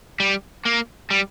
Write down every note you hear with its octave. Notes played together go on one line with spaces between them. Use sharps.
G3
A#3
G3